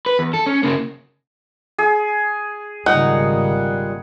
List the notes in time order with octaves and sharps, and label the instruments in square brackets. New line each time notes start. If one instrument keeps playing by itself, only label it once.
[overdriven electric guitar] B4
E2
A4
C#4
C#3 A#3
[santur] G#4
[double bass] G#1 C#3 [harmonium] A#2 G3 [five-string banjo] D#4 [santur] F#5